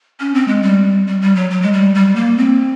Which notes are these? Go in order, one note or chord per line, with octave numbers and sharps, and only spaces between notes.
C#4
C4
G#3
G3
G3
G3
F#3
F#3
G#3
G3
G3
A#3
C4